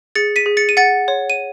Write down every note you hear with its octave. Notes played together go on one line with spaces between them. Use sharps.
G#4 A6 C#7
B6 D#7
G#4
A6 C#7
D#7
F#5 A6 C#7
C#5
D#7